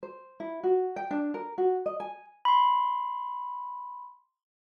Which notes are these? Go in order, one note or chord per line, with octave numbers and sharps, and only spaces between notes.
C5
E4
F#4
G5
D4
A#4
F#4
D#5
G#5
B5 C6